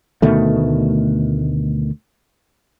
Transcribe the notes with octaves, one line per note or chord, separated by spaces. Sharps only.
D2 B2 D#3 A3